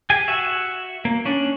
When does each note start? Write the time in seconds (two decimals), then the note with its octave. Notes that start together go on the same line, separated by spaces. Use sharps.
0.10 G4 G#4 G#5
0.28 F#4 E5
1.05 A#3
1.25 C#4 D4